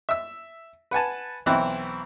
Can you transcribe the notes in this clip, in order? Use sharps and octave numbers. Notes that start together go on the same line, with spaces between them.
E5 E6
B4 F#5 G#5 A5
B1 E3 C4 E4 F#6